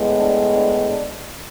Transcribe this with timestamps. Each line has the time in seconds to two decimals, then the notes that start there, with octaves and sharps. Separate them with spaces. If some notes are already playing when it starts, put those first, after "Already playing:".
Already playing: A2 G#3 B3
0.19 D4
0.55 D4
0.89 D4